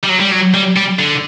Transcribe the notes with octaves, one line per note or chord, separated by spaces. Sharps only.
G3
F#3
G3
F#3
G3
G3
D3